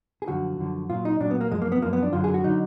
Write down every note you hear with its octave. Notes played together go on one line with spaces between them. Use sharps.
G#4
F#2 D3 F3 F#4
F#2 D3 F3
A#2 F#3 F4
D#4
A#2 F#3 D4
B3
A#3
F#2 F3 G#3
A#3
B3
F#2 F3 A#3
B3
D4
F#2 D3 F#3 F4
G#4
F#4
D3 F#3 D#4